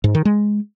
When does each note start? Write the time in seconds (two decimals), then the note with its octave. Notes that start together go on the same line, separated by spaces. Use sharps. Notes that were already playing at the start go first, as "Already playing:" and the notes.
0.04 G#2
0.15 D#3
0.25 G#3